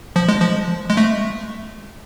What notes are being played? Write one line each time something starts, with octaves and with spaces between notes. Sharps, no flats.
F3
G#3
F3
G#3
A3